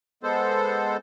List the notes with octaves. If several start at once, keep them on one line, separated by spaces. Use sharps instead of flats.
G#3 B3 A4 C5